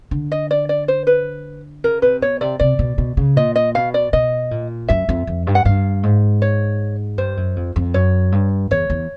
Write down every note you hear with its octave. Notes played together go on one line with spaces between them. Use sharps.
D3
D#5
D5
D5
C5
B4
C#3 A#4
C3 B4
B2 C#5
C3 D5
C3 D5
B2
B2
C#3
A#2 D#5
D#5
B2 F5
D5
B2 D#5
A#2
F#2 E5
F2
F2
G2
F#5
G2 F5
G#2
C#5
G2 C5
F#2
F2
F2
F#2 C#5
G2
E2 C#5
E2